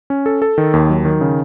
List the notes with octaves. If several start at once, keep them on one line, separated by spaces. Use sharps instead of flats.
C#4
A4
A4
D#3
D#2
F#3
D#3
C#3